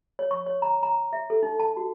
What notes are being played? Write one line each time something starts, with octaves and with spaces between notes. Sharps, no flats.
C#5
C#6
C#5
A#5
A#5
E5
A4
D#4
A5
F#4